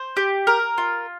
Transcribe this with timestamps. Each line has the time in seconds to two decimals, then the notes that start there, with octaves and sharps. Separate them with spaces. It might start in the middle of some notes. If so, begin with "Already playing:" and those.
Already playing: C5
0.17 G4
0.47 A#4
0.78 F4